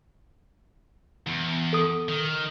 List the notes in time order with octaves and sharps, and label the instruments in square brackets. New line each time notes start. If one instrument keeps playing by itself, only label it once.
[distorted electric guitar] E2
[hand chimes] A4 D#6
[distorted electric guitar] D#3